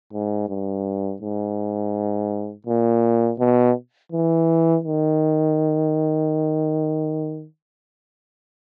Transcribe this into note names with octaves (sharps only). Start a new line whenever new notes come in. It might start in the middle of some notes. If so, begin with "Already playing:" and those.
G#2
G2
G#2
A#2
B2
E3
D#3